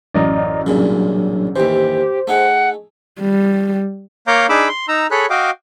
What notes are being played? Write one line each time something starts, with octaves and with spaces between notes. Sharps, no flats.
A1 F#2 D5 D#5 A#5
C2 A#2 C#3 F#3 D4
D#2 E3 G4 C5
A3 D#4 G#4 F#5
G3
A#3 C#5 F5 A#5 D6 G6
D4 D#4 G#4 B5 D6 E6
C6
D#4 A#5 E6
G#4 A4 C#5 B5 F#6
F#4 D#5 F5 G5 D6